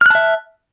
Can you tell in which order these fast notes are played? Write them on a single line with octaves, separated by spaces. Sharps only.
F6 F#6 A5 E5